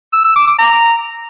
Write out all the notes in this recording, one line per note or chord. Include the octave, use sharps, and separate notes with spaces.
E6
E6
D6
D6
A#5